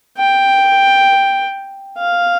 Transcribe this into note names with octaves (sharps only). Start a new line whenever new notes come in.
G5
F5